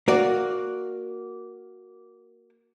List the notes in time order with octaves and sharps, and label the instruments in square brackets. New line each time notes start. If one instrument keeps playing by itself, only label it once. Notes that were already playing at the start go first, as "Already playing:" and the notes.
[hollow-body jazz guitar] A#3 F#4 D5